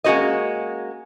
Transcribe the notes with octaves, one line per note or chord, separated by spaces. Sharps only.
G#3 A#3 C#4 F#4 C5 D#5